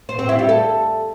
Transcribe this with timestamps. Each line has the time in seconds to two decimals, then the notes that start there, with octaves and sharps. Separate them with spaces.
0.09 C5
0.19 C4
0.29 E4
0.39 G3
0.49 A4